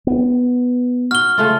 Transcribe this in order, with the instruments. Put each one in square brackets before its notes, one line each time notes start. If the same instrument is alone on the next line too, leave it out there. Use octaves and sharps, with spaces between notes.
[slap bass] B3
[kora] F#4 [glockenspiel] F6 G7
[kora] C#3 A3 F4